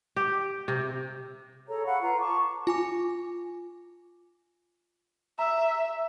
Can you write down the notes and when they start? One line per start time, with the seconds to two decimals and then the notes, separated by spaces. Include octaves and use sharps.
0.16 G4
0.68 C3
1.68 G#4 A4 C#5 A#5
1.86 F5 F#5 B5 C#6
2.02 F4 B4 A#5
2.19 A5 C#6 D6
2.67 F4 G#5 D6
5.39 E5 A#5 E6